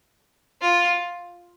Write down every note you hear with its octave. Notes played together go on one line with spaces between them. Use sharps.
F4